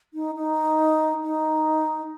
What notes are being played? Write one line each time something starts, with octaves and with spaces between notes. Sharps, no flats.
D#4
D#4
D#4